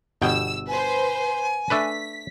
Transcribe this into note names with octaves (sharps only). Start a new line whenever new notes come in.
G1 B2 G5 E6
B4 C5 G#5
A3 D4 B4 B6